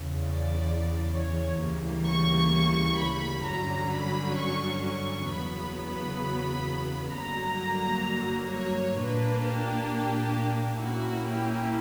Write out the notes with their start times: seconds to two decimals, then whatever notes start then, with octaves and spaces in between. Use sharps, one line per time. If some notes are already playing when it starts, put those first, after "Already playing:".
Already playing: E2 C#3 E3
0.22 D5
1.13 C#5
1.60 D2 C#3 E3 G3 A#3
2.06 C#6
2.98 B5
3.44 G2 D3 F#3 C#4 A#5
3.90 B5
4.37 C#6
4.83 C#6
5.28 E2 C#3 F#3 B3 B5
5.75 B5
7.13 G2 D3 F#3 A#3 A#5
8.52 C#5
8.97 A#2 A#3 D4 B4
9.44 G4
10.81 A#2 A#3 C#4 E4 F#4
11.28 G4